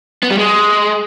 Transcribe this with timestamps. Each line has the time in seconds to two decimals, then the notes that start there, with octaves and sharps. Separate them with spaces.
0.23 B3
0.31 G3
0.39 G#3